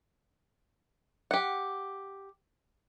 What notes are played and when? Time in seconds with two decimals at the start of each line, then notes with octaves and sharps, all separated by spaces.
1.31 G4 F#5